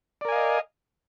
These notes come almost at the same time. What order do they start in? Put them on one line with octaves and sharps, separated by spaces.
D5 A#4 G#5 F5 D#5